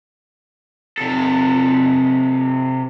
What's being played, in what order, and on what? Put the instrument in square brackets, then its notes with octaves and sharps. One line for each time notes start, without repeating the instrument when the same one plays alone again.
[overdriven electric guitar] C3 A4